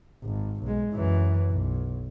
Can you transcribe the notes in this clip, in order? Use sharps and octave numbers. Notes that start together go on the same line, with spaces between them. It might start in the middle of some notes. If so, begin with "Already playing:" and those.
G#1
B1 G#3
F#2 E3
B1